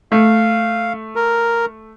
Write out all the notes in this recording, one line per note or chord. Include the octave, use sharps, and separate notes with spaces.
A3 F5
A#4